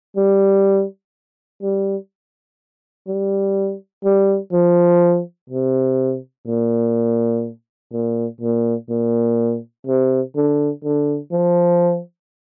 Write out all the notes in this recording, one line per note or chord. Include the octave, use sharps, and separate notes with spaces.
G3
G3
G3
G3
F3
C3
A#2
A#2
A#2
A#2
C3
D3
D3
F3